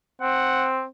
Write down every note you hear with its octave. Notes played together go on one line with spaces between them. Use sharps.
C4 F#5